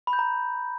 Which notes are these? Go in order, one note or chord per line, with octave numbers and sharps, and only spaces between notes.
B5
G6
A#5